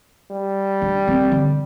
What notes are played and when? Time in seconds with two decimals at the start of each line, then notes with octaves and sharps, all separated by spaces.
0.31 G3
0.82 D4
1.08 C4
1.32 D3